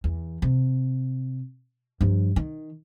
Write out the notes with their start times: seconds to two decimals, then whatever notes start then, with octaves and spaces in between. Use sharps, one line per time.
0.04 E2
0.42 C3
2.01 G2 F3
2.36 D#3